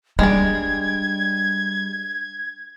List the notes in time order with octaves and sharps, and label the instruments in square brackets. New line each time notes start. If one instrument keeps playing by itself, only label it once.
[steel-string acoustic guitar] G3 [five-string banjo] G#3 D5 [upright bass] D4 [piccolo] G#6